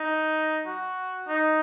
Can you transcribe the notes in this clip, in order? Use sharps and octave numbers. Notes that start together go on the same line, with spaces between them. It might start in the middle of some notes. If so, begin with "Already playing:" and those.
Already playing: D#4
F#4
D#4